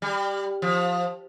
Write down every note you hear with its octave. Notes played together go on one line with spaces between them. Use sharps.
G3
F3